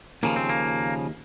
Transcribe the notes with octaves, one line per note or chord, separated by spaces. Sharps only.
D#2 C#3 F3 A#3
C4
A#3